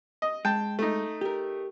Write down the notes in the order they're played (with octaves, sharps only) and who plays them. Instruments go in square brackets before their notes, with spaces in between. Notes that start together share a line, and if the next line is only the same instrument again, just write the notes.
[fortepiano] D#5
[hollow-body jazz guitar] G#3 [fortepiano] G5 A5
[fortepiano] A3 D#4
[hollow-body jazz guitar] G4 A#4